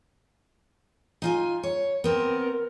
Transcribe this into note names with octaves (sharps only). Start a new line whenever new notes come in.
D#4 F4 G#5
C#5
B3 C4 A#4